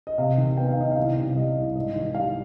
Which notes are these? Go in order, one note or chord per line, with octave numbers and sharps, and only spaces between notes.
D#5
C3 F5
D#3
B3 G5
F5
D#4 D#5
F5
C2
C3
G3 D#5
C2
G#2 D#5
D#3
G3 F5